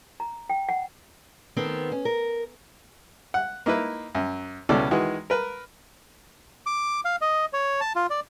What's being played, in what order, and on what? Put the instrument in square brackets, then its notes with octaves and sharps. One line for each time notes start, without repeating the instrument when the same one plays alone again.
[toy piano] A#5
G5
F#5
[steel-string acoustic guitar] D#3 B3 C4 A4
C#4
A#4
[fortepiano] F#5
A#3 D#4 E4 B4
F#2
C#2 B2 C#4 E4 A4 D5
D#3 E3 G#3 F#4
A#4 B4
[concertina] D6
F5
D#5
C#5
A5
F4
D5